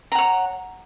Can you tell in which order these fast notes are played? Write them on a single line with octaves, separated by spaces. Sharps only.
A#5 F#5 C#5